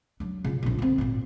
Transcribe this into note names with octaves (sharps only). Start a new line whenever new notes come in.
F#3 D4
C#3 F4
A#1 D4
D3 C4
G#1 A#2